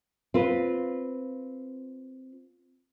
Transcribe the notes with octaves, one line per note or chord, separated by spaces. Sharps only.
C4 F4 B4